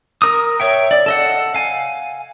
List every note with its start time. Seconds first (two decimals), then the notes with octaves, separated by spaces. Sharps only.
0.22 A#4 D#6
0.60 C#5 E5 G5
0.91 D5
1.06 A4 D#5 F#5
1.55 F5 G#5